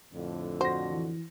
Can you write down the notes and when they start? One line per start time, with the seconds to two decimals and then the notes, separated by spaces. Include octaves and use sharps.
0.14 F2 A2 D3
0.61 F#4 C5 A#6
0.91 E3